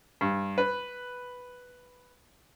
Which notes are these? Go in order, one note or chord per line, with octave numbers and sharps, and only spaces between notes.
G2
B4